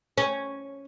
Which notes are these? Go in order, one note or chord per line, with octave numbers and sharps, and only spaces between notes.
C#4